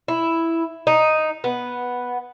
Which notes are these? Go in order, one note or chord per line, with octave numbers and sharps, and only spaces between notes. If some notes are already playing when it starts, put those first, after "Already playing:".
E4
D#4
B3